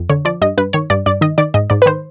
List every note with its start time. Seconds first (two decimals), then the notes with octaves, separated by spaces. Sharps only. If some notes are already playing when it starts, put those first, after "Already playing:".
Already playing: F2
0.09 D3 C#5
0.25 F3 D5
0.41 G2 D#5
0.57 G2 B4
0.73 D#3 C#5
0.90 G2 D5
1.06 G2 D5
1.21 D#3 D#5
1.38 D#3 D5
1.54 G#2 D#5
1.70 G#2 D5
1.82 B4
1.86 D#3 C5